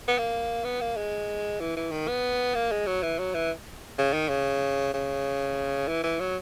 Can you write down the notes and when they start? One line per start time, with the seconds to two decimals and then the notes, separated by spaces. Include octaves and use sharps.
0.08 B3
0.18 A#3
0.65 B3
0.81 A#3
0.97 G#3
1.60 E3
1.77 E3
1.91 D#3
2.08 B3
2.55 A#3
2.72 G#3
2.86 F#3
3.03 E3
3.19 F#3
3.34 E3
3.98 C#3
4.13 D#3
4.29 C#3
4.94 C#3
5.88 E3
6.03 E3
6.20 F#3